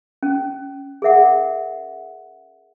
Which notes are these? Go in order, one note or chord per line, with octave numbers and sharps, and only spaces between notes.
C#4
G#4 A#4 E5 F#5